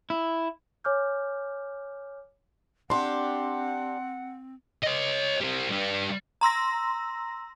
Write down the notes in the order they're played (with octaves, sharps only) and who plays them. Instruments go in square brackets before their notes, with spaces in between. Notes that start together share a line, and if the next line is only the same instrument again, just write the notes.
[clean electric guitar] E4
[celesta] C#5 G#5 D6 F6 G6
[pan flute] C4 [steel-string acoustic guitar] D4 G4 [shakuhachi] F#5 [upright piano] C6
[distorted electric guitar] C#5 D#5
G3 C4
G3 D4
[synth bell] A#5 C6 E6 A#6